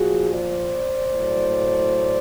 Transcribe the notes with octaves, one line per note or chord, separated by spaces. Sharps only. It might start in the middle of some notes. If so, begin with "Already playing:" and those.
Already playing: A#2 F3 F#4 G#4
C5 D5
A2 F#3